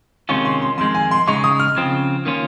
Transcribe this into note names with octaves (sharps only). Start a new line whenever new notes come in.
C3 D#3 G#3 C#4 F4 C#6
C6
C6
F2 D#3 G#3 C6
G#5
C6
C#3 G#3 D#4 C#6
D#6
F6
C#3 F3 C4 F4
D#3 A#3 C#4 F4